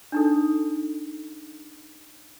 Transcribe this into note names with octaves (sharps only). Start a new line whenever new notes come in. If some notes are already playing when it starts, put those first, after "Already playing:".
D4 D#4 A4